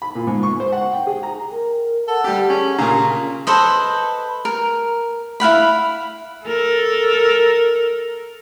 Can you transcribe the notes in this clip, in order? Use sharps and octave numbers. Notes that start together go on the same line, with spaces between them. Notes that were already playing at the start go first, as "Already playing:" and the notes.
B5
A#2
G#2
C#6
C5
F#5
G5
G#4
A#5
A#4
A4 F#5
G3 G4
C#4 G#4
A#2 C#3 A#5
A4 B4 C5 D#5
A#4
E4 F5 F#5 B5
A4 A#4